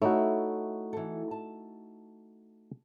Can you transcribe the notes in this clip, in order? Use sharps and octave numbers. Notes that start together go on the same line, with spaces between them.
A3 D#4 E4 F#4 A4 C#5
E3 A4
A5